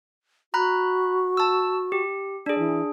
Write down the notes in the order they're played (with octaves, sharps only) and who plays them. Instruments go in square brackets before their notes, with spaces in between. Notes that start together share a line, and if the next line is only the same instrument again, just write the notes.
[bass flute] F#4 [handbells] A#5 B5 F#6
[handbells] A5 E6
G4
[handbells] D4 G#4 [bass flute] D5
[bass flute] E3